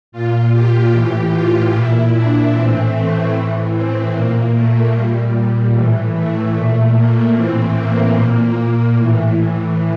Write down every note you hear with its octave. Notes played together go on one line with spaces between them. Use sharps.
A#2 F4
G4
A2 E3 G4
F4
A#2 E4
D4
A2 E3 C4
A3
A2 E3
C4
A#2 A#3
A3
A#2 G3
A2 E3
A3
A#2
A#3
A2 E3 C4
A#3
A#2 A#3
A2 E3